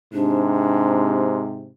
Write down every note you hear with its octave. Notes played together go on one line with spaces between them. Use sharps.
G#2 C3 D4